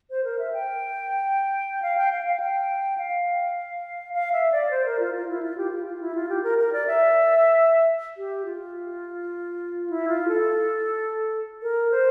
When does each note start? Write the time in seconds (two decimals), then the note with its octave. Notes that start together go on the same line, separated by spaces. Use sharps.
0.10 C5
0.24 A#4
0.39 E5
0.53 G5
1.82 F5
1.97 G5
2.12 F5
2.26 F5
2.40 G5
2.98 F5
4.13 F5
4.32 E5
4.52 D5
4.71 C5
4.85 A#4
5.00 F4
5.14 F4
5.29 E4
5.43 F4
5.57 G4
5.71 F4
5.86 F4
6.00 E4
6.15 F4
6.29 G4
6.43 A#4
6.58 A#4
6.73 D5
6.87 E5
8.17 G4
8.45 F4
9.90 E4
10.09 F4
10.28 A4
11.62 A#4
11.91 C5